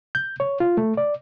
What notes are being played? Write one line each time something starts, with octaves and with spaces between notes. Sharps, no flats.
G6
C#5
F4
A3
D5